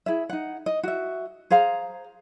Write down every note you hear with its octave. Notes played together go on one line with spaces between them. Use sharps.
E4 G#4 E5
D#4 F#5
D#5
F#4 E5
G#4 C5 F5 A#5